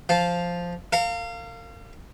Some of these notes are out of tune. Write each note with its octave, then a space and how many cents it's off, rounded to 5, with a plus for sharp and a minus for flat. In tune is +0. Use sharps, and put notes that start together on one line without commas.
F3 +0 F4 +0
A#4 -40 F5 +0